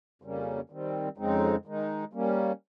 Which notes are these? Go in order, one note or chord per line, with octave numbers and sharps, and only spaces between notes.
F2 C#3 G3 A#3 C#4
D#3 G3 C4
F2 C#3 G#3 C4 D#4
D#3 G#3 D#4
G3 A#3 C#4